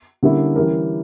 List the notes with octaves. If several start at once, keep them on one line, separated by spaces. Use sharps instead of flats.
D3 G3 A#3 C#4 E4
E3 G3 C#4 G4 A#4